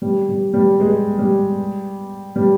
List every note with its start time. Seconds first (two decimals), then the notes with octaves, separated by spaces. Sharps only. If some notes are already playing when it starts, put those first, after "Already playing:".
0.02 G3
0.29 G3
0.53 G3
0.80 G#3
1.19 G3
2.36 G3